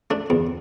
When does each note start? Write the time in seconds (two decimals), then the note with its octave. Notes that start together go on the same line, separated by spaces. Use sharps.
0.10 A3 D4
0.30 E2